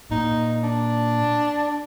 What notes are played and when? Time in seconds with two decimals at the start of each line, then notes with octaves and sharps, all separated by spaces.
0.11 A#2 D#4
0.63 D4